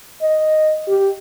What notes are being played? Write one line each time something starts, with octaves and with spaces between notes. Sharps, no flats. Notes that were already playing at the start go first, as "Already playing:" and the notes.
D#5
G4